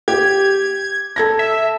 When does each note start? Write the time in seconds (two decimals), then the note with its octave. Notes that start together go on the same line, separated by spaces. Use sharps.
0.08 G4 G#6
1.16 A4 G#6 A#6
1.39 E5